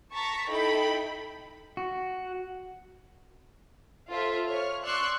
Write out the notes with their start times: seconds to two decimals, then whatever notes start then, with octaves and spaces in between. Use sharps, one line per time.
0.14 A5 A#5 C#6 A6 B6
0.50 D#4 E4 A4 G5 B5
1.77 F#4
4.11 F4 A4 C5 E5
4.47 C#5 F6
4.83 D5 C6 C#6 E6 F#6